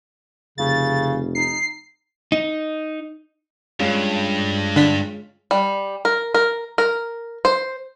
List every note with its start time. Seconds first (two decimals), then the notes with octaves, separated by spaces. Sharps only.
0.58 F1 C#3 A6
1.35 D#4 C7
2.32 D#4
3.80 G2 G#3 C#4 F4
4.76 D3 D4 B6
5.51 G3
6.05 A#4
6.34 A#4
6.78 A#4
7.45 C5